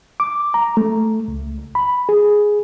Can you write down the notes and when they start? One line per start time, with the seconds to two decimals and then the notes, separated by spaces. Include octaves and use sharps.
0.20 D6
0.54 A#5
0.77 A3
1.28 C#2
1.75 B5
2.09 G#4